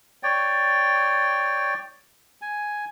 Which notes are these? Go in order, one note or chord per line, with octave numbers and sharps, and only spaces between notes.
C#5 D5 G5
G#5